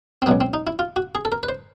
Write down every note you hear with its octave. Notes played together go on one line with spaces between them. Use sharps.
C4
C#2 B2 F#3 B3
C4
D#4
E4
F4
F#4
G#4
A4
A#4
B4
C5